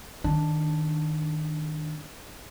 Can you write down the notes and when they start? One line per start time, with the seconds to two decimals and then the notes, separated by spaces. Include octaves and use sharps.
0.24 D#3 D4